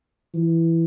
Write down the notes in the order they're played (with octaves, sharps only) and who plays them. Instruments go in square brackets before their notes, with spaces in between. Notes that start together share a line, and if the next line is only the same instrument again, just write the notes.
[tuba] E3